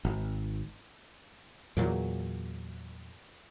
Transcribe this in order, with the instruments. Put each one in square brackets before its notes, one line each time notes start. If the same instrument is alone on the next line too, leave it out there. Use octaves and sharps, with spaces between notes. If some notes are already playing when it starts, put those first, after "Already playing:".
[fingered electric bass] G#1
[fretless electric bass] E2 A#2 F#3